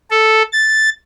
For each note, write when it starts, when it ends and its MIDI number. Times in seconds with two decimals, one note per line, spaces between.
0.11 0.43 69
0.53 0.89 93